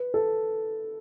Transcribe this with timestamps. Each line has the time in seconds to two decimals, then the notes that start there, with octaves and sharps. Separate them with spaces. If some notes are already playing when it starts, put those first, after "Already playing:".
Already playing: B4
0.14 A4